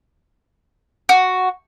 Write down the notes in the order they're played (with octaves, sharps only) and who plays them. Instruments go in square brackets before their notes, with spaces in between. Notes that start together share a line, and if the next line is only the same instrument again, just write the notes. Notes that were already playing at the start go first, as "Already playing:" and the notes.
[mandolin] F#4